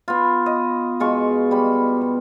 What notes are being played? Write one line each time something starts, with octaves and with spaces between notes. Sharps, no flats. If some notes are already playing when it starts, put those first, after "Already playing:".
B3 F4
D#5
B2 G#3 F4 C#6
G3 B5
B2